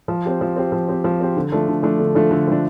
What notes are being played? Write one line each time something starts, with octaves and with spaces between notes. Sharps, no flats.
F3
C4 G4
F3
C4 G4
F3
C4 G4
F3
C4 G4
D3
F3 A3 D4
D3
F3 A3 D4
D3
F3 A3 D4
D3
F3 A3 D4